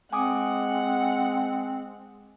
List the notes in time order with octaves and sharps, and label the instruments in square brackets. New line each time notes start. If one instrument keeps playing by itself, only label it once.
[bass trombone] G#3 [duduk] C4 [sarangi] F#5 [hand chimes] G#5 D6 D#6